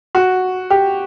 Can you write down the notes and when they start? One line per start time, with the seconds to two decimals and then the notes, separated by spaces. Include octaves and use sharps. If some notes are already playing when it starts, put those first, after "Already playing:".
0.15 F#4
0.70 G4